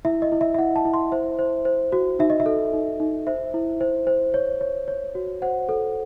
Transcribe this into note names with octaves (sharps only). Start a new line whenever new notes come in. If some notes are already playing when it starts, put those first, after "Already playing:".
E4 E5
D#5
E4
E5
E5
E4 F#5
A5
E4
C6
C5 E5
C5
C5
F#4
D#4 E5
D#5
E5
A4
D#4
D#4
C5 E5
E4
C5
C5
C#5
C#5
C#5
F#4
C5 F#5
A4